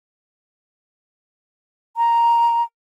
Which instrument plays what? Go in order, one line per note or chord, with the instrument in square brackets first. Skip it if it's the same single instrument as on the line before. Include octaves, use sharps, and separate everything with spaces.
[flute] A#5